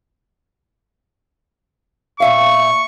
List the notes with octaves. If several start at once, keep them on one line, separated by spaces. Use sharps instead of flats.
A#2 E5 F5 C#6